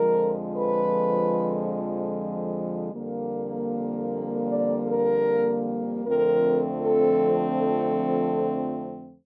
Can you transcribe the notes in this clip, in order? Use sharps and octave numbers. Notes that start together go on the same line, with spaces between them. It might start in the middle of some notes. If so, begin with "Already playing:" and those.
Already playing: F2 D3 F3 G#3 A#4
B4
F2 D3 G3 A#3
D5
A#4
F2 D3 F3 A3 C4 A#4
A4
A4